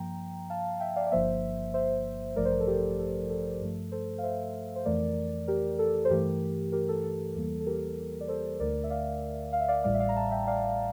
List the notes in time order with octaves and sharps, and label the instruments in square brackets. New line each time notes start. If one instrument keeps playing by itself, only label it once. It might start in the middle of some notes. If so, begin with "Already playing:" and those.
Already playing: [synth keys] G2 F3 A#3 G5 A#5
F5 A5
E5 G5
D5 F5
D5
G1 G2 F3 A#3 C5 E5
C5 E5
A1 G2 F3 A3 A#4 D5
C5
A#4
A4
G4
A4
A4
G2 F3 A3
A4 C5
F5
C5 E5
C5
F2 E3 A3 A#4 D5
G4 A#4
A4
C5
G2 E3 A3 G4 A#4
G4 A#4
A4
A4
E2 E3 G3 A#3
A4
G4 A#4
D5
A4 C5
D2 D3 A3 A#4 D5
E5
D5 F5
F5
E5
D5 F5
A1 A2 G3 D5 F5
E5
D5 F5
A#5
F5 A5
E5 G5
D5 F5